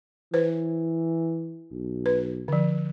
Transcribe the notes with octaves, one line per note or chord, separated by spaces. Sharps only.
E3 B4 C5
B1
B4
D3 F3